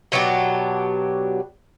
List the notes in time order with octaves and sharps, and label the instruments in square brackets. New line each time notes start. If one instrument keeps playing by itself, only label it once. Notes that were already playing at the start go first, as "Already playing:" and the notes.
[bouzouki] B2 F#3 D4 G4